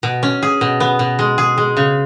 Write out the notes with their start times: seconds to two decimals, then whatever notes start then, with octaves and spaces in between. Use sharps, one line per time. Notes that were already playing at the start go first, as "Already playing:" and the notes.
0.03 B2
0.23 C#4
0.42 G#4
0.61 B2
0.80 B3
0.99 B2
1.19 G#3
1.38 G#4
1.58 G#3
1.77 C#3